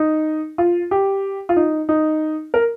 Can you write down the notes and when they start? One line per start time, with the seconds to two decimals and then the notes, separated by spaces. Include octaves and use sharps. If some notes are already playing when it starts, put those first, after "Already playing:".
Already playing: D#4
0.58 F4
0.91 G4
1.49 F4
1.56 D#4
1.89 D#4
2.54 A#4